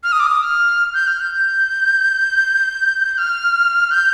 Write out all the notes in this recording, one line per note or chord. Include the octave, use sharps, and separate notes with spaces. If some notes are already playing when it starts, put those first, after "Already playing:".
F6
D#6
D6
D#6
F6
G6
F6
G6
G6
F6
G6